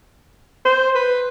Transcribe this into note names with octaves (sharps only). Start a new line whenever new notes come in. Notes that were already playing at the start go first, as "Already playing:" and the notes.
C5
B4